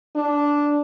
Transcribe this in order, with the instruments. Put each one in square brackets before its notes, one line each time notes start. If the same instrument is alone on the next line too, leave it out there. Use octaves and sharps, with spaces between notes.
[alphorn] D4